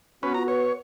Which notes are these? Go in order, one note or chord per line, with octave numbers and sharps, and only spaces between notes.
B3 C#4 F#4 B4
F4 A#5
B4 C#5